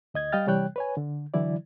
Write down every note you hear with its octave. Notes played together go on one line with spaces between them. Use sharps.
D2 D#5 G#6
G3 D#5 F5 G5 F6 A6
C3 E3 G3 C#5 G5 F#6
B4 C#5 G#5
D3
D3 E3 F#3 E4 D5